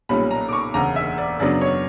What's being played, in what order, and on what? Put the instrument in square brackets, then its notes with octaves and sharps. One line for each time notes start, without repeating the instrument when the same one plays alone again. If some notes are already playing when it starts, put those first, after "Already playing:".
[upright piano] B1 A#2 G3 C#4 B5
A#5
D6
C#6
E1 D2 C#3 A#5
E5
D5
F#2 C#3 F#3 B3 D4 D5
C#5